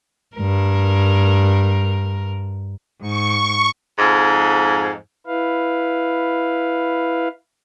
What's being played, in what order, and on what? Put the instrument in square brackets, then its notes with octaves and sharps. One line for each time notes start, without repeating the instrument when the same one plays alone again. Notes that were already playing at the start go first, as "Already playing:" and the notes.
[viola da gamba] G2 A#4
[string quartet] G#2 [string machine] C#6
[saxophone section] F2 G#2
[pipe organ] E4 B4 F5